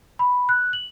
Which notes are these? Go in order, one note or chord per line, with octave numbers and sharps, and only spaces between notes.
B5
F#6
F#7